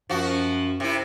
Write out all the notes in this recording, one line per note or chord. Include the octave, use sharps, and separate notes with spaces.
F#2 F3 F#4
C3 E4